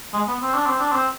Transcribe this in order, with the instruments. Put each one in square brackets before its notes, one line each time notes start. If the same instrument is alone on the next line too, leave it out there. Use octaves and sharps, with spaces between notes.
[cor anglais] G#3
B3
C4
D4
C4
D4
C4